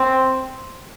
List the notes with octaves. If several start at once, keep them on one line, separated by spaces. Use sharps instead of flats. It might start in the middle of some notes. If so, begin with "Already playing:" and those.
Already playing: C4